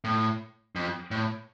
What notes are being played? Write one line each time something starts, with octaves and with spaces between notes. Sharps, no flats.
A2
F2
A2